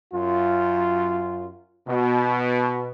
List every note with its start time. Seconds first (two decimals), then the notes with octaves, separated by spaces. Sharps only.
0.13 F#2 F4
1.88 B2